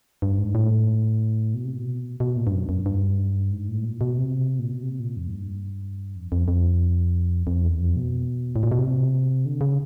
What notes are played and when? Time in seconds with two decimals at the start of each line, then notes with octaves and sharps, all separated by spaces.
0.22 G2
0.39 G#2
0.55 A2
1.54 B2
1.65 C3
1.75 B2
2.20 B2
2.37 A#2
2.47 G2
2.53 F#2
2.69 F#2
2.86 G2
3.51 G#2
3.69 A2
3.84 A#2
4.01 B2
4.18 C3
4.59 A#2
4.71 B2
4.83 C3
5.00 A#2
5.17 F2
5.28 G#2
5.33 G2
6.16 F2
6.32 F2
6.48 F2
7.47 F2
7.64 E2
7.80 F2
7.96 B2
8.56 A2
8.63 A#2
8.72 B2
8.79 C3
9.46 D3
9.61 C#3